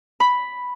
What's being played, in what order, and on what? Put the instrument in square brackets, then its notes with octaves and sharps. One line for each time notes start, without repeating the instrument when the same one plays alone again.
[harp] B5